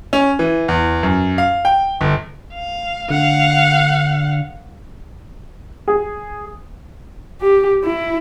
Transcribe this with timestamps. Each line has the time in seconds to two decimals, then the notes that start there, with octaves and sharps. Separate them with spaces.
0.13 C#4
0.39 E3
0.68 E2
1.03 F#2
1.38 F5
1.65 G5
2.01 G1
2.53 F5
3.10 D3 F5 F#5
5.88 G#4
7.41 G4
7.85 E4